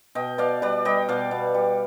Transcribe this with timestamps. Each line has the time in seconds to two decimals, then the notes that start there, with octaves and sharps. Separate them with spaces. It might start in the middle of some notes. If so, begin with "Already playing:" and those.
0.15 B2 D#5 G5
0.38 B2 D5 F5
0.62 G3 B4 D5
0.85 G3 D#5 G5
1.09 B2 D5 F5
1.31 B2
1.54 G3